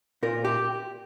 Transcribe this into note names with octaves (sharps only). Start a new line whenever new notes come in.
A#2 A#4
G4